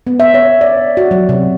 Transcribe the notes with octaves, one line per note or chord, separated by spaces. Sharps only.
B3
E5
C#5
D5
F#4
F#3
C3